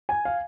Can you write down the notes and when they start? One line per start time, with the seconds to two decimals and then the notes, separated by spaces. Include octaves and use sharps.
0.09 G#5
0.25 F5